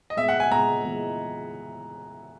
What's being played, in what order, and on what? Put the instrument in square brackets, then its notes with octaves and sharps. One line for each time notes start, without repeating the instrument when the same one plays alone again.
[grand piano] D#5
[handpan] A#2 G#3 B3 [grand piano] E5
[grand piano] F#5
G#5
[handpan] A#2 G#3 B3 [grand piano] A#5
[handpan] E3 G#3 B3